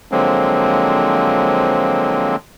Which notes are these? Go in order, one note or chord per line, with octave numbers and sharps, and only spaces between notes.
D3 F3 F#3 G#3 A#3 C4